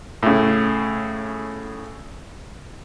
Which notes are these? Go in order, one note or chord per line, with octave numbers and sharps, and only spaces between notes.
A2 C#3